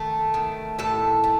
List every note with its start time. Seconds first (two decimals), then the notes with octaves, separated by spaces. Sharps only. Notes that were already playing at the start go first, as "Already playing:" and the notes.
Already playing: D#3 A3
0.34 D#3
0.79 A2 A4
1.24 A3